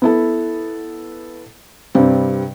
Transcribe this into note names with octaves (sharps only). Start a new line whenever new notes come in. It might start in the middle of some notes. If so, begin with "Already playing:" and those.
B3 E4 A4
G2 C3 G3 C4